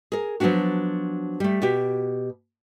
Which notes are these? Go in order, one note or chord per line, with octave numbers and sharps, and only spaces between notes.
G#4 A#4
F3 F#3 B3 C#4 D4 F#4
G3 A3
B2 F#4 G4